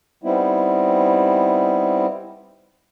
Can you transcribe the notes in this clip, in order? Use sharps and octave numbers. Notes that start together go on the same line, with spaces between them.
G3 B3 C4 D#4 E4